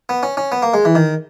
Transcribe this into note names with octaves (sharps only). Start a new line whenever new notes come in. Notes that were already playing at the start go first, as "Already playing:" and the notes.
B3
C#4
C#4
B3
A#3
G#3
E3
D#3